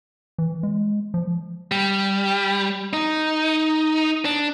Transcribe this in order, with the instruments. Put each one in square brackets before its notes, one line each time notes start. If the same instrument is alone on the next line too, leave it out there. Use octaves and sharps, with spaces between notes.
[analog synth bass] E3
G#3
F3
[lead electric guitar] G3
D#4
D4